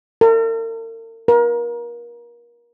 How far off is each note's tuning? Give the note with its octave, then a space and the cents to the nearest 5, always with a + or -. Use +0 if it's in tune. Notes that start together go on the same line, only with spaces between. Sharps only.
A#4 -45
A#4 +30